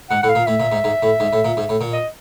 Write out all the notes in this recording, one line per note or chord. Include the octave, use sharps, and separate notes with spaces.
G#2 F#5
A2 F#5
F5
A#2
A2 E5
A#2
G#2
G#2
A2
G#2
A2
A#2
G#2
A2
A#2
D#5